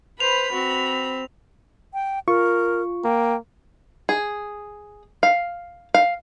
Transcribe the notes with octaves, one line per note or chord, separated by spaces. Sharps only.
B4 C5 B5 F7
C4 F#4
G5
F4 A#4 C#6
A#3 G5
G#4
F5
F5